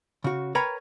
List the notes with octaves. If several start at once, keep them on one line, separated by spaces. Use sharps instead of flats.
C#3 F#4
A#4 B4 C#5 G5 A#5 B5